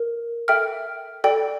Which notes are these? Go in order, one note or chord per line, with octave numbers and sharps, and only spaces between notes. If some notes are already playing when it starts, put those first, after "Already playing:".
Already playing: A#4
A4 E5 G5 F6
A4 D5 G5